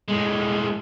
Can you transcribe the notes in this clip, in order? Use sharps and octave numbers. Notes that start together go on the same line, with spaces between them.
A2 G#3